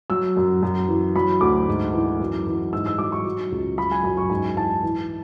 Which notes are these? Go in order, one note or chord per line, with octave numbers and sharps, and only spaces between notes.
F#3 E6
F#2
F#2
E3
F#3 B5
D2 D6
G#2
E3
F#2
E3
G#2 E6
E6
F#3 D6
C#6
F#3
C#2
F#3 B5
G#5
F#2 B5
C#6
G#2 G#5
E3 A5
E3